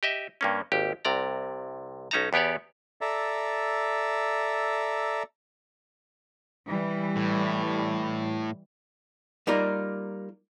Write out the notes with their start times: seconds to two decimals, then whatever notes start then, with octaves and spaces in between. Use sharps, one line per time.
0.03 G4 D#5 E5
0.41 G2 A#3 C#4
0.72 G#1 D#2 G4
1.05 C2 C3 D5 A#5
2.11 B1 C#4 D#4 A5 A#5
2.33 E2 B3 G4 C#5 D5
3.01 A4 D5 E5 A#5
6.67 E3 G3
7.16 A2
9.47 G3 A#3 D#4 F4 A#4